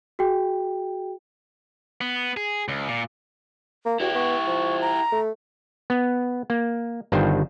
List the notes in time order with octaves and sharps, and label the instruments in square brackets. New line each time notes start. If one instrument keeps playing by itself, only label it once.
[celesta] F#4 G#4 G5
[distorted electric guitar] B3
G#4
C#2
A#2
[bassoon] A#3
[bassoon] E2 [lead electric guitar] E4 G4 [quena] F#4
[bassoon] B3 [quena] C#6
[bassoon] F3
[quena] A#5
[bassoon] A3
[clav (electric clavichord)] B3
A#3
G1 G2 D#3 G3 F4 C5